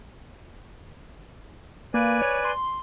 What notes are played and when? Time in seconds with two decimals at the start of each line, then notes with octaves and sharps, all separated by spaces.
1.94 A#3 B4 D5 G#5
2.22 C#5
2.45 C6